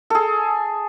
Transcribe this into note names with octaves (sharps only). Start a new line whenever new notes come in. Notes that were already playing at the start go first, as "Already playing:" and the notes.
G#4 A4